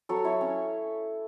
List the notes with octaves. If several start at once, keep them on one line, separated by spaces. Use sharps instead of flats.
F#3 A4 C#5
E4 C#5 E5
C#4